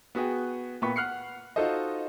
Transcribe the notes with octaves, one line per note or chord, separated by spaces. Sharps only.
B3 F#4 G#4 G5
A#2 B3 G5 B5 C#6 B6
F#5 F6 F#6 C7 C#7
D#4 F4 F#4 A4 C5 D#5